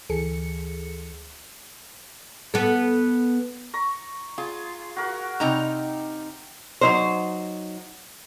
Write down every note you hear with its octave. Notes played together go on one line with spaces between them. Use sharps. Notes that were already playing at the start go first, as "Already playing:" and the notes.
D2 E3 G#4 A4 C#7
B3 A4
A#5 C#6
F4 G#4
F#4 A#4 F#5
C3 D#4 G5 A#5
F#3 D#4 C5